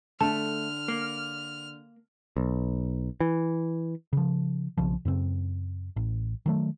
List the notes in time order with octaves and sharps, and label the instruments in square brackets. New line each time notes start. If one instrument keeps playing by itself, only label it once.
[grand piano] D3 [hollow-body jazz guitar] A3 [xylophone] A5 [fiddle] F6
[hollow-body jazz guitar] A#3
[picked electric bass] B1
E3
C#3 F3
B1 C#3 F3
F#2 C#3 C4
A1
D#3 F#3 A3